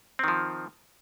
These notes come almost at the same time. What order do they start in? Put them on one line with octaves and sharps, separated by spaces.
C4 D#3 F3